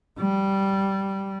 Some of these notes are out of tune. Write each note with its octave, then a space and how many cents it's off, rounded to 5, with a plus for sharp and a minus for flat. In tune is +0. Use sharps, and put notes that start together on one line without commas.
G3 -10